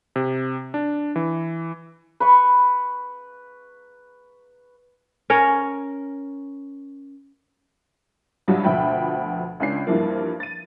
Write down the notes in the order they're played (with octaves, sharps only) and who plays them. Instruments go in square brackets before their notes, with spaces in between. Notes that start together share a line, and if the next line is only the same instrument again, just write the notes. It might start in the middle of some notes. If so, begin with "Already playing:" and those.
[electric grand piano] C3
D4
E3
[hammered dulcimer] B4 B5 C#6
[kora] C#4 A#4 C#5
[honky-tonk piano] C2 G2 F#3 G3
D2 B2 F3 E5 G5 B5
C#2 C#4 D4 C7
G2 E3 F3 A#3
A6 D#7